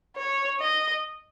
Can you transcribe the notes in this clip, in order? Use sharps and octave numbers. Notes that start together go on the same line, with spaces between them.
C#5
D#5